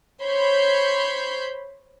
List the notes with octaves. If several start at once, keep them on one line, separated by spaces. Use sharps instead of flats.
C5 C#5 B5 C6 G6